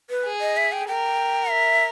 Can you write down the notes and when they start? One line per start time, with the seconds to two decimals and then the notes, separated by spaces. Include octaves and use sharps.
0.10 B4
0.25 G#4
0.41 D#5
0.57 E5
0.72 G5
0.88 A#4 G5
1.51 E5